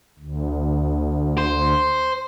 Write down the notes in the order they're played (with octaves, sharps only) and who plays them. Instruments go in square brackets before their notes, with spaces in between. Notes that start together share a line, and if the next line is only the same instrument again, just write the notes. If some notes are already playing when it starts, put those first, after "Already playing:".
[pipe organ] D2
[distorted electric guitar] C5